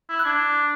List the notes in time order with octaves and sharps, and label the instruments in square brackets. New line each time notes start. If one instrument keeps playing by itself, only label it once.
[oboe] E4
[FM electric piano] F#6
[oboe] D4 [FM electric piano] G#6